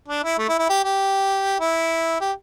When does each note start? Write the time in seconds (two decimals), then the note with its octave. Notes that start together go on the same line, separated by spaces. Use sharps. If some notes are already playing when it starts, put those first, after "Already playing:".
0.08 D4
0.24 E4
0.38 A3
0.48 E4
0.59 E4
0.69 G4
0.84 G4
1.60 E4
2.21 G4